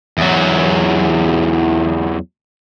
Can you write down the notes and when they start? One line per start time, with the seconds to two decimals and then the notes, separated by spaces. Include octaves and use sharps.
0.18 E2 F#3